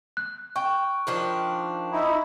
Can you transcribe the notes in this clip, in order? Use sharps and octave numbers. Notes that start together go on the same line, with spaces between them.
F#6
G5 C#6
D#3 F3 D4
D#4 E4